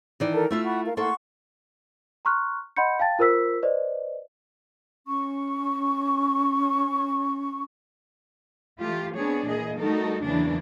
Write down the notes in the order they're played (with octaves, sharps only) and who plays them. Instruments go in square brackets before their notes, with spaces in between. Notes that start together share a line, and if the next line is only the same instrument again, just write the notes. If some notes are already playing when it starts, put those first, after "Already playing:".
[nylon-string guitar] D#3 E3 D5
[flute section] A4 A#4 A5
[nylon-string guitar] A3 E4 F4 [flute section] E6
[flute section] F#5 B5 C#6
A#4 F5
[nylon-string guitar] A#3 E4 A4 [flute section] F#5 C6 C#6
[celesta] A#5 C6 C#6 F6 F#6
D#5 F#5 B5 C6 G6 C#7
F5 G5 A5 A6
F4 A#4 C5 E6 B6
B4 C5 D5 D#5
[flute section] C#4 C#6
[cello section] E3 A3 F4 G4
B3 C4 D4 G#4 C#5
A#2 E3 G#4 D#5
G3 A3 D#4 F#4 A4 A#4
E2 C#3 E3 F#3 A#3 D4